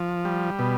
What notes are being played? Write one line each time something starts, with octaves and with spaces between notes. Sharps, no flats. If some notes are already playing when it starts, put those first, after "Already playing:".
Already playing: F3
G3
B2